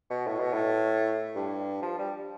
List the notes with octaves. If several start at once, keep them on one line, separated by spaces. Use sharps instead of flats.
B2
A2
B2
A2
G2
F3
G3